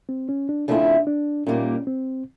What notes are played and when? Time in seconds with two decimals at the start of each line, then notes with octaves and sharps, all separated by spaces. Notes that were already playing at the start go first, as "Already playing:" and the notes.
0.09 C4
0.29 C#4
0.49 D4
0.68 C#3 F3 A3 C4 D4 E4
1.07 D4
1.46 A#2 G3 A#3 C#4 D#4
1.87 C4